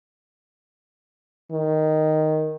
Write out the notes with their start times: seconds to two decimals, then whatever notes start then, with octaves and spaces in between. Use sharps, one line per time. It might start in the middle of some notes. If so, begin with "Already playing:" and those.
1.52 D#3